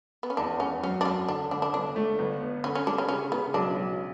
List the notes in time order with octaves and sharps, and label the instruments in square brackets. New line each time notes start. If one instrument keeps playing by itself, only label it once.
[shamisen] B3
C#4
[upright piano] E2 [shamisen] D4
[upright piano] E2 [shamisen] C#4
[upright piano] F#2 [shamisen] C#4
[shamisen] D4
[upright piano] F#2 [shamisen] C#4
[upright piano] D3 [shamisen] D4
[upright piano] D3 [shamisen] D4
[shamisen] D4
[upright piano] G1 [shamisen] D4
[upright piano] A3
G1
B3
[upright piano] D3 [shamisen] C#4
[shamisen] C#4
[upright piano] G3 [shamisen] D4
[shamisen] C#4
[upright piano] C#3 [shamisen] C#4
[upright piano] C#3 [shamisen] B3
[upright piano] B1 [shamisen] D4
[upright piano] B1